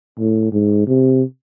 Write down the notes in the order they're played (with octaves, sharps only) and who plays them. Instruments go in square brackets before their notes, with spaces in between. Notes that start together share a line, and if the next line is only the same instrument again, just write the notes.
[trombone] A2
G#2
C3